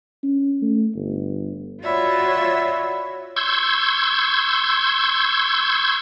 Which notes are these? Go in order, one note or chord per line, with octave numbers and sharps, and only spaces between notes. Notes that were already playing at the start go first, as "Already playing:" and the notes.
C#4
A3
G1
F4 F#4 C#5 D5 E5 B5
C6 C#6 E6 G6 G#6